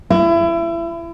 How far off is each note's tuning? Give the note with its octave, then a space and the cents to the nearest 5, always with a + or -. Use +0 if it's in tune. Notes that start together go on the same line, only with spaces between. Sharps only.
E4 +30